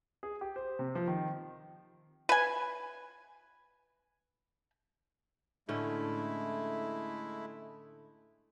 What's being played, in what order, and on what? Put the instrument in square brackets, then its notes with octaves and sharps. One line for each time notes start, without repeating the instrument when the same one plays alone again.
[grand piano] G#4
G4
C5
C3
F3
D#3
[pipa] B4 G#5
[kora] A2 D3 C#4 [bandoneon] G#3 A3 E4